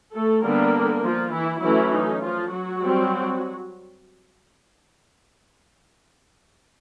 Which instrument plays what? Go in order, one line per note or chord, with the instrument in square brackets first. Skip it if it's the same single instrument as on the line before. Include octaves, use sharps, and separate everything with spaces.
[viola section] A3 A4
D3 G3 A#3 B3 D4 A#4
F3 F4
E3 E4
E3 F#3 A3 C#4 E4
D#4
F3 F4
F#3 F#4
G3 C4